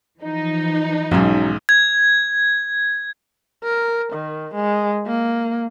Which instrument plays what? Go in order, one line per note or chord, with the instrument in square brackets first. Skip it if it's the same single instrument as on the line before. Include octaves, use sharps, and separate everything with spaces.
[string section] E3 F3 D#4
[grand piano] B1 G#2 [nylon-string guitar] F#3 C#4
[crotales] G#6
[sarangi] A#4
D#3
G#3
A#3